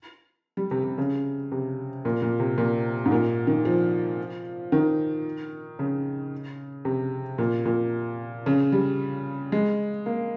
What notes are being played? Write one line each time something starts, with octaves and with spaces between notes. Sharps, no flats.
G3
C3
C3
C#3
C3
A#2
A#2
C3
A#2
G#2
A#2
D#3
F3
D#3
C#3
C3
A#2
A#2
C#3
G3
G#3
A#3